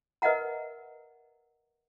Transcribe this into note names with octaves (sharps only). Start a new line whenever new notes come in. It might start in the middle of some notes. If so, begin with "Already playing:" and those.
A#4 B4 D#5 E5 F#5 A#5